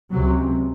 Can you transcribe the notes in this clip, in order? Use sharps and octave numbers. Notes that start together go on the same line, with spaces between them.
C#2 C3 F#3